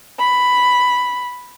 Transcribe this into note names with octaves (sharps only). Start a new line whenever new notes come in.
B5